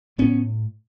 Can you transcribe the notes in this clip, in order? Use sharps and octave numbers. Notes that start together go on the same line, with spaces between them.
A2 B3 C#4